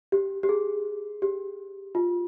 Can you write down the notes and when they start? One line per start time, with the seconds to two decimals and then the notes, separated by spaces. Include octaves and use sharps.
0.12 G4
0.43 G4
0.49 G#4
1.22 G4
1.95 F4